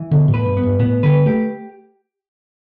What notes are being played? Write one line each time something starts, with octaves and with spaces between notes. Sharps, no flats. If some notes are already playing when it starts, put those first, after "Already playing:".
Already playing: E3
B2 D3
A2
B4
G2
B3
G2
A2 B3
D3 B4
A3 G4